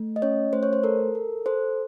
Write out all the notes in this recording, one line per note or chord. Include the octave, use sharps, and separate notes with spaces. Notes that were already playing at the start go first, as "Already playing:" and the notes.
Already playing: A3
D#5
C#4 C#5
A3 C5
C#5
C5
A4 A#4
A4
A4 C5